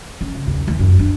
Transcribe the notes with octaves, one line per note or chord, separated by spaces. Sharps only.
C#4
C#3
D#2
D#2
F#2
D4